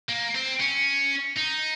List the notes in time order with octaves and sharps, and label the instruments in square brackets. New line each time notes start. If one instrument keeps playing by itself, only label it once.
[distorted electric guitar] A#3
C4
C#4
D#4